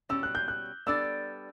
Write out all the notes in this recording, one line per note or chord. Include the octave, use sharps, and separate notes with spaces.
B2 G3 C#4 E6
F#6
G6
F#6
G3 B3 D4 A4 D5 E6